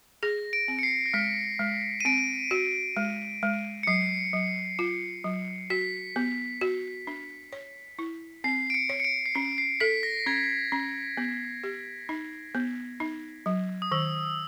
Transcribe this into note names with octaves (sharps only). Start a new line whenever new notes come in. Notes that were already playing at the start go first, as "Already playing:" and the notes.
G#4 A#6
D7
C4
C#7
C7
A#6
G#3 B6
G#3
D#7
C4 D7
F#4
G#3
G#3
C#7
F#3 C7
F#3
F4
F#3
F#4 B6
B3
F#4
D4
C#5
E4
C4 C7
D7
C#7
C#5
C#7
D7
C7
C#4 C#7
C7
A4 B6
A#6
C#4 G#6
C#4
B3
G4
D#4
B3
D#4
F#3
D#6
D#3 E6